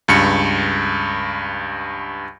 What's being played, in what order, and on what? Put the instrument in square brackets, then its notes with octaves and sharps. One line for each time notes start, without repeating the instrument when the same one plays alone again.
[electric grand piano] C#2 G2 C#7